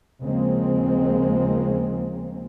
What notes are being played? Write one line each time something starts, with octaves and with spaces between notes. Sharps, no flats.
D#2 C#3 F3 G#3 A#3 C4